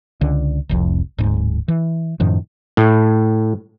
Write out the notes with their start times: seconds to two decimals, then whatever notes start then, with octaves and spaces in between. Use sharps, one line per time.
0.21 C#2 D3
0.69 F1 C2 F2
1.18 D1 G#2
1.68 E3
2.20 F#2 A2 D#3 F3
2.77 A2